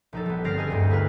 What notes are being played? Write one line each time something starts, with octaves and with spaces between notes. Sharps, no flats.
A#1 D#4 A4
G3 B3
G1 C4 D5 F6 A#6 C7
G#4 A4 D#5 G#5 G6
D2 G2
E4 G#4 A#4 B4